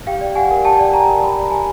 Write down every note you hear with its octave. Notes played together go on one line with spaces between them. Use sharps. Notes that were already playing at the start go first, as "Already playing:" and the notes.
G4 F5 G5
D5
G4 F#5 G#5
A#4
G4 G5 A5
D5
G4 G#5 A#5
A#4
G4 B5
A#5
D5 A5
G4 G#5 A#5